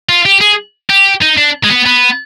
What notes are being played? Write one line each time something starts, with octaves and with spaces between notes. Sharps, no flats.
F4
G4
G#4
G4
D#4
D4
G#3
B3
B3